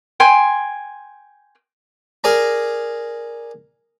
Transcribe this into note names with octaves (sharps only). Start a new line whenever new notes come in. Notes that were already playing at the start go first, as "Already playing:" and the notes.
G5 G#5 C6
G#4 A#4 D5 G#5 A#5